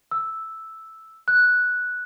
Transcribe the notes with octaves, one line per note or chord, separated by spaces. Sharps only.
E6
F#6